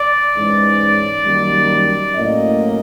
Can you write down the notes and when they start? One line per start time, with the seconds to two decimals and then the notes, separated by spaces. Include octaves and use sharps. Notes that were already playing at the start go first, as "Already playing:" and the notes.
Already playing: D5
0.36 G#2 E3 G#3 C#4
1.25 F#2 D#3 G3 A#3
2.15 A2 F#3 A#3 C#4 D#5